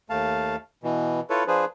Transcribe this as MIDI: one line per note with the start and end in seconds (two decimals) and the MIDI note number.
0.10 0.56 39
0.10 0.56 57
0.10 0.56 77
0.10 0.56 81
0.83 1.20 47
0.83 1.20 52
1.30 1.44 64
1.30 1.44 65
1.30 1.44 69
1.30 1.44 71
1.30 1.44 73
1.47 1.65 53
1.47 1.65 62
1.47 1.65 68
1.47 1.65 71
1.47 1.65 72